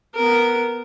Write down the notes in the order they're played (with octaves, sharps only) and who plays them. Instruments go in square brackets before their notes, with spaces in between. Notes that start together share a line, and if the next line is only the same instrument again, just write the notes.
[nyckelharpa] B3 A#4